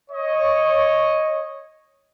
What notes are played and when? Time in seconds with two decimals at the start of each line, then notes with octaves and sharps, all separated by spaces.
0.11 C#5 D#5